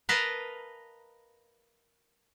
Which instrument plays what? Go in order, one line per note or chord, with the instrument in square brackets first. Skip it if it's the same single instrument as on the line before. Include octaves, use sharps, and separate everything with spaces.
[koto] A#4 B4 D#5 F5 A5 A#5